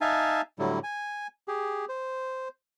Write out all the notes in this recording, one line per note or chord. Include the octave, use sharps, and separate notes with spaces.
D#4 E5 F5 G#5 A5
A2 D3 F#3 G3 E4
G#5
G4 G#4
C5